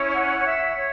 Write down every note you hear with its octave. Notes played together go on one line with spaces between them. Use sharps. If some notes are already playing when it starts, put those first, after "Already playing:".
Already playing: C#4 E4 C#5
F#5
C#5
E5
C#5